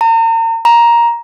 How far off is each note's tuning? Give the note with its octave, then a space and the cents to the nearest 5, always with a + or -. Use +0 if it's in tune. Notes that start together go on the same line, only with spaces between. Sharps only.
A#5 -40
A#5 +10